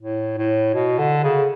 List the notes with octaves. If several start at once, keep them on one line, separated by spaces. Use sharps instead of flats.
A2
A2
B2
D3
C#3